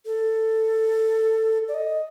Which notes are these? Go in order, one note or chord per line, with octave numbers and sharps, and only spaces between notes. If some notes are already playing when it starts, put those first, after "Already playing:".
A4
D5
D#5